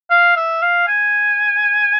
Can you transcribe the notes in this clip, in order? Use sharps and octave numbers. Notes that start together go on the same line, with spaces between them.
F5
E5
F5
G#5